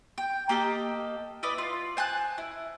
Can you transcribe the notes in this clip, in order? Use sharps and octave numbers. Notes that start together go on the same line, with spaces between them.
G5
A#3 G4 A4 D#5
E4 B4 D5 D#5
F4
C5 G#5 A5 F#6
E4